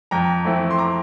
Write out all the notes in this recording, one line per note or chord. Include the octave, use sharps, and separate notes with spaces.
F2 G5 A#5
E3 A3 C4 E4
C6
A#5 D6